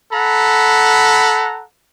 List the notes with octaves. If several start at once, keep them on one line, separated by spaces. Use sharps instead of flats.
A4 F#5 A#5 B5